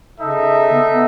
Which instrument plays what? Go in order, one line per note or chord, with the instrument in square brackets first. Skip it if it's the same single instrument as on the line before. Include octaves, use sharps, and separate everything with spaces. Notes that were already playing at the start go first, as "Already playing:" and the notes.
[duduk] C#3 [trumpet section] D#4 A4 E5
[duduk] B3
B3